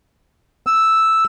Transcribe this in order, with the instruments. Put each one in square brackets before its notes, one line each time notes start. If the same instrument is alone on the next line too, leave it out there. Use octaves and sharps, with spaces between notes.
[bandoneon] E6